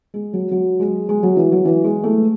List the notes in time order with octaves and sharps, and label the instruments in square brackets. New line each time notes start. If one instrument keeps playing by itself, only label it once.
[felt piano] G#3
F#3
F#3
G#3
G#3
F#3
E3
F#3
E3
G#3
A3